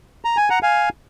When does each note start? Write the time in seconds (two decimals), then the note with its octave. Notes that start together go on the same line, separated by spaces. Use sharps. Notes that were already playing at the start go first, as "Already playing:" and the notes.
0.25 A#5
0.37 G#5
0.50 F#5 A#5
0.63 F5 G#5